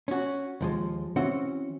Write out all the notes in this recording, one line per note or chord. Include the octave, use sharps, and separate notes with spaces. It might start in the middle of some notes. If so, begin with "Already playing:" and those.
C#4 F#4
D#2 F3 G#3
E3 C4 C#4 F#4 F#5